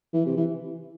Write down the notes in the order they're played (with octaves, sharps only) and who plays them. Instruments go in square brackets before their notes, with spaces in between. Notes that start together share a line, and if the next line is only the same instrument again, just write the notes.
[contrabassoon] E3
C3
E3